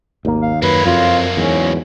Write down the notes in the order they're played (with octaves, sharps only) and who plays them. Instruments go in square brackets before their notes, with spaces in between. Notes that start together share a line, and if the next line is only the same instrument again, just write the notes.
[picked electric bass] G#1 C#3 A#3 [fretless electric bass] D#2
[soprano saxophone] F5
[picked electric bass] F#2 [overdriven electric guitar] F#3 A#3 [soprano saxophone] B4
[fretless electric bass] F2 [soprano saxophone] F4
[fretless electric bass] E2 G#2 [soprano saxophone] C#4